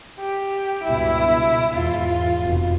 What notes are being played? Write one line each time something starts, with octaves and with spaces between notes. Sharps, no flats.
G4
C#2 G2 B2 E4
E2 G#2 F4
F1 B2